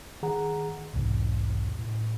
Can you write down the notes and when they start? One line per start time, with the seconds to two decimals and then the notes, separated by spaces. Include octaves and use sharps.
0.23 D#3 G#4 F#5 A#5
0.93 B1 E2 G#2 C3
1.79 A2